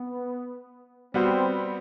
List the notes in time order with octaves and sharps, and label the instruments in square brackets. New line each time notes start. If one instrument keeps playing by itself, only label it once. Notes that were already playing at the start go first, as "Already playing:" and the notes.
Already playing: [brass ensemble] B3
[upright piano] G3 B3 F#4 C5 [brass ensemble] C4